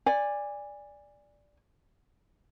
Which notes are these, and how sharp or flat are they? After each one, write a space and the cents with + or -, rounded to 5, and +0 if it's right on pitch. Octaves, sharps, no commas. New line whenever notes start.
D5 +0 G#5 -20